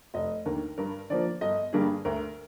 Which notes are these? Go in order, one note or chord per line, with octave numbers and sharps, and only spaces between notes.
F1 D#5
D#2 D3 A#4
G2 A#4
D3 F3 A#3 D5
G1 D#5
G2 D3 G3 A#3 G#4
D2 A#4